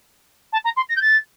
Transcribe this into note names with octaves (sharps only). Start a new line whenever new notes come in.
A5
A#5
C6
A#6
G6
A6